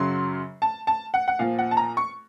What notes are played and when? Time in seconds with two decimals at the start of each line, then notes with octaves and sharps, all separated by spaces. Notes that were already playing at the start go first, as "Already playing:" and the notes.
Already playing: F#2 C#3 F#3 C6
0.62 A5
0.87 A5
1.14 F#5
1.28 F#5
1.39 A#2 F3 F5
1.59 F#5
1.71 A5
1.77 A#5
1.97 C#6